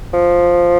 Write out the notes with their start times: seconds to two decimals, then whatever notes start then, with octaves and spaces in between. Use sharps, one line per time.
0.13 F3